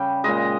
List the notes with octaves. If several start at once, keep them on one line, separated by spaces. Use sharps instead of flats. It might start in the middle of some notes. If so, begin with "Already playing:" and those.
Already playing: C#3 G3 G5
A#2 G#3 D#5